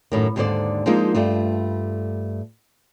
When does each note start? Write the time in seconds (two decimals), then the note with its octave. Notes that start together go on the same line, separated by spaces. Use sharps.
0.12 F#2 A2 D#3
0.36 D#2 G#2 D3 A4 C5 D5
0.86 F3 G#3 A#3 D4 D#4 F4
1.15 G2 A3 F4